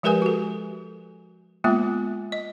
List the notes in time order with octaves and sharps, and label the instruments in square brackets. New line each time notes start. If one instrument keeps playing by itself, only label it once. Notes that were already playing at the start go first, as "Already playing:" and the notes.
[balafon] F3 G#3 G4 A#4 B4 G#5
F#4 A4
G#3 A#3 B3 F4
D#5